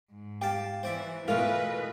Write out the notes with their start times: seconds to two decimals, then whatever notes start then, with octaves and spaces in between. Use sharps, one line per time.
0.11 G#2
0.41 G4 F5 G5 A5
0.83 E3 C5 D5 E5
1.28 B2 E3 A3 F4 A#4 B4 D#5 F5